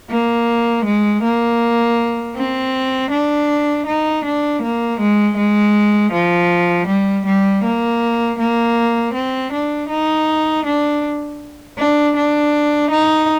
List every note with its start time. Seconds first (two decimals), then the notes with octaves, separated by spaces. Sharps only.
0.10 A#3
0.85 G#3
1.23 A#3
2.36 C4
3.11 D4
3.87 D#4
4.25 D4
4.62 A#3
5.00 G#3
5.37 G#3
6.13 F3
6.87 G3
7.26 G3
7.64 A#3
8.39 A#3
9.14 C4
9.52 D4
9.89 D#4
10.65 D4
11.78 D4
12.16 D4
12.90 D#4